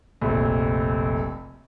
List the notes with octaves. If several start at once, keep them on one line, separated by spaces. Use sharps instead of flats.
F1 A#1